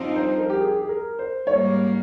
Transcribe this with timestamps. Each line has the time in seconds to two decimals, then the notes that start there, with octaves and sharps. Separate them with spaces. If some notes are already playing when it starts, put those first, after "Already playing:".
Already playing: G2 F3 C4 D#4
0.16 C5
0.38 A#4
0.50 G4
0.60 G#4
0.81 G#4
0.89 A#4
1.19 C5
1.47 G#2 G3 A#3 C#5